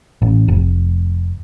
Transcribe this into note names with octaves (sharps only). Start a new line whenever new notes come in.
A1
F1